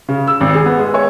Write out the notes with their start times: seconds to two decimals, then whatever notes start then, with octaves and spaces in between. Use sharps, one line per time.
0.08 C#3
0.27 E6
0.41 G#1
0.54 G#4
0.66 B3
0.78 G#3
0.94 C#5